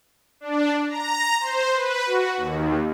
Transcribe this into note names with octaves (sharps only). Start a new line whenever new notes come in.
D4
A#5
C5
B4
F#4
D#2